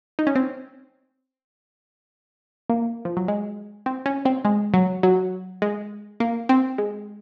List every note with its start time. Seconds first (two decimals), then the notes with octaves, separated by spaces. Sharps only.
0.19 D#4
0.27 C#4
0.35 C4
2.70 A#3
3.05 F3
3.17 F#3
3.28 G#3
3.86 C4
4.06 C#4
4.25 C4
4.45 G#3
4.74 F#3
5.03 F#3
5.62 G#3
6.20 A#3
6.49 C4
6.78 G#3